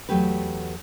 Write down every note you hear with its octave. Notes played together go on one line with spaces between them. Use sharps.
E2 F#3 A3 G4 B4